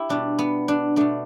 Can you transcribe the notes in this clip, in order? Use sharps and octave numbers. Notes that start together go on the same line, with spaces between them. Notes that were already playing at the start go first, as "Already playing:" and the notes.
Already playing: E4 G4
B2 G3 D4
B3
D4
B2 A3 D4